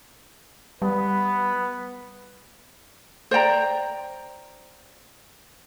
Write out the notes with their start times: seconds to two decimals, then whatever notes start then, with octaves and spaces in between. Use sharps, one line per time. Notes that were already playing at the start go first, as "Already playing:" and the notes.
0.82 G3 B3 B4
3.31 C5 D5 G5 A#5